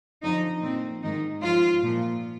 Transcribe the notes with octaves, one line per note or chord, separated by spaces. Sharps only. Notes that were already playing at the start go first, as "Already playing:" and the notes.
F2 D3 F3 D#4
A#2 F3 C4
G#2 D#3 D#4
G#2 F3 F4
A#2 F3